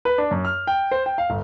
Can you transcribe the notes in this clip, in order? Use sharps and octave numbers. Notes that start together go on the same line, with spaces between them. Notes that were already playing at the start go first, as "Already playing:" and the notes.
B4
D4
F#2
F6
G5
C5
G5
F5
G1